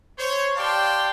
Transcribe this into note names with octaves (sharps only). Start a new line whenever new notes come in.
C5 C#5
G4 D5 F5 G5 A5 C6